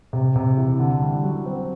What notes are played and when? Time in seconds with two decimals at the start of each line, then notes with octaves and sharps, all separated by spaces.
0.13 C3
0.36 C3
0.58 E3
0.79 D3
1.02 G3
1.24 F#3
1.46 C4